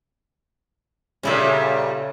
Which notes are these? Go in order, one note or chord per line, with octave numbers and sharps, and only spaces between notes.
A#2 C#3 G3 C#4 E4 A4